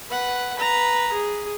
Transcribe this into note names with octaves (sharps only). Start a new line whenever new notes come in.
B4 F#5
B4 A#5
G#4